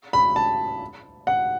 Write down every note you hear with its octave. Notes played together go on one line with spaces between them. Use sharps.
B5
A5
F#5